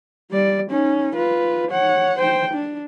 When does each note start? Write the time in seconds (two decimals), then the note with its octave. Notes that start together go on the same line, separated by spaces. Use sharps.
0.31 G3 D5
0.70 C#4 D#4
1.15 F4 B4
1.71 C#5 F#5
2.19 C5 G5
2.54 D4